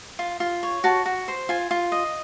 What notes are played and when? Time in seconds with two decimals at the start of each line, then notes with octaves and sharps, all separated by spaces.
0.19 F4
0.40 F4
0.63 C#5
0.84 F#4 A5
1.06 F#4
1.28 C5
1.49 F4 G#5
1.71 F4
1.92 D#5